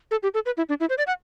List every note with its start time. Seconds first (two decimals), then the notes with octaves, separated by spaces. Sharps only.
0.11 A4
0.23 G4
0.34 A4
0.46 B4
0.57 E4
0.69 D4
0.80 E4
0.90 C5
0.98 D5
1.07 F#5